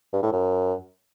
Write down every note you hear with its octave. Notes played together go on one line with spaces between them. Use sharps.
G2
A2
F#2